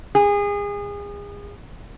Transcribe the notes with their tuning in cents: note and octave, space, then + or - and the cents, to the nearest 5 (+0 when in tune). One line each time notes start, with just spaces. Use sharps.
G#4 -30